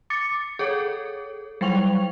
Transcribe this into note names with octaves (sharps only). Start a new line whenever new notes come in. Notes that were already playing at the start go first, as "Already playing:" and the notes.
D6 A6 C#7
G#4 A4 C#5
F#3 G3 G5 C#6 F7